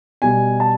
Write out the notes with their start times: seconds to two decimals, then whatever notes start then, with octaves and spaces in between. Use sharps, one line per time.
0.22 B2 G3 G#5
0.60 A5